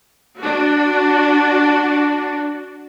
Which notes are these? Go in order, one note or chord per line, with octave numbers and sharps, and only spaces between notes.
D4 F#4